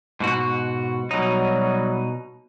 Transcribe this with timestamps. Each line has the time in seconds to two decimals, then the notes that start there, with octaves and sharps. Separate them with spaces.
0.20 G#2 B2 F#4
1.11 B2 F#3 G3 D#4